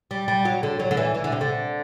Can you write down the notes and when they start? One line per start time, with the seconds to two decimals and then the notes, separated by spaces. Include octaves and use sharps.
0.11 G3
0.28 G3
0.45 F#3
0.63 D3
0.80 F#3
0.91 D3
0.97 E3
1.15 E3
1.24 D3
1.32 C3
1.41 D3